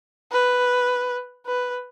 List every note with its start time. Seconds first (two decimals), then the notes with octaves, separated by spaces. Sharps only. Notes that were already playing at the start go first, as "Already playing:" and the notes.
0.32 B4
1.46 B4